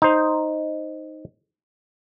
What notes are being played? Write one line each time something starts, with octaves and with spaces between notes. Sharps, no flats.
D#4 C5